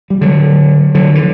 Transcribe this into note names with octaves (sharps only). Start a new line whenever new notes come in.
G3
D3 F#3
D3 F#3
E3
D3